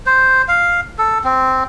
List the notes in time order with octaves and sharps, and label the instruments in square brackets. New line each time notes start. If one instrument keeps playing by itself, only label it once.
[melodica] C5
F5
A4
C4